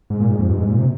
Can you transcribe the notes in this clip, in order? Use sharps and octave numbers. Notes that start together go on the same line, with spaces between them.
G#2
A#2
G#2
F2
G2
G#2
A#2
C3